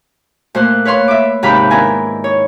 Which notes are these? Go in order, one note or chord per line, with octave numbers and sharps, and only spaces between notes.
A#2 A3 C5 C6 F#6
B4 C#5 F5 C6
E5 D6
D#2 G#2 C3 G4 F5 B5
D#3 B3 D4 E4 A#4 G#5
C#5